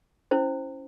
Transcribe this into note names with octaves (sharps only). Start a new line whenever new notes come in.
C#4 E4 C5